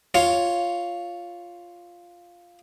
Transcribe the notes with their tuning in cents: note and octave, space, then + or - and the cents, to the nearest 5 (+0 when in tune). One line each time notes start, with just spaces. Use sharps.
F4 +0 C#5 +0